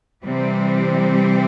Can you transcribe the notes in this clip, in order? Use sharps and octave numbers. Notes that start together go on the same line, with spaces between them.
C3 E3 G3 C4